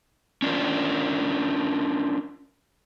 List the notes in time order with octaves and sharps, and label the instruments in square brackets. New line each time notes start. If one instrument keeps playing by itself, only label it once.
[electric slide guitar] C#4 D4 F4 A#4